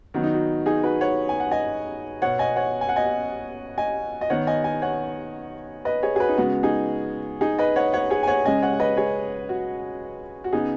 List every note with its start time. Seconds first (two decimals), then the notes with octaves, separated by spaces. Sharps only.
0.14 D#3 F#3 B3 F#4
0.24 D#4
0.34 F#4
0.66 D#4 G#4
0.83 F#4 B4
1.01 C#5 F#5
1.29 G#5
1.40 F#5
1.51 D#5 G#5
2.22 B2 B3 C#5 F#5
2.39 D#5 G#5
2.56 C#5 F#5
2.81 G#5
2.89 F#5
2.96 D#5 G#5
3.78 D#5 G#5
4.21 D#5
4.30 D#3 B3 C#5 F#5
4.47 D#5 G#5
4.64 D#5 G#5
4.82 C#5 F#5
5.85 B4 D#5
6.03 G#4 C#5
6.16 G#4
6.20 F#4 B4
6.29 D#4
6.38 C#3 G#3 B3 F#4
6.63 D#4 G#4
7.41 D#4 G#4
7.59 B4 D#5
7.76 C#5 F#5
7.93 C#5 F#5
8.10 G#4 C#5
8.23 G#5
8.28 C#5 F#5
8.45 C#3 G#3 C#4 D#5 G#5
8.62 C#5 F#5
8.73 F#5
8.80 B4 D#5
8.97 G#4 C#5
9.49 F#4
10.44 F#4
10.52 C#3 B3 D#4 G#4